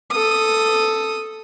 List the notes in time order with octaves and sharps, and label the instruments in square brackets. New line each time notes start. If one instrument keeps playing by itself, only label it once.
[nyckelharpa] A4 D#6